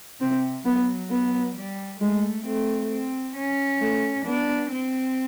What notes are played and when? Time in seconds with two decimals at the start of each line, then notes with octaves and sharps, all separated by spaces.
0.21 C3 C4
0.65 F#3 B3
1.11 B3
1.56 G3
2.01 G#3 A3
2.46 A3 C4
2.90 C4
3.36 C#4
3.81 A3
4.26 B3 D4
4.71 C4